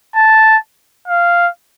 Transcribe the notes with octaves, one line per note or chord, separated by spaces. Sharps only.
A5
F5